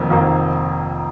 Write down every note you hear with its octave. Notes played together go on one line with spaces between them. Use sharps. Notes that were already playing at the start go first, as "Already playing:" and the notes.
Already playing: F1 F2 D#3 A#3
F1 F2 D#3 A#3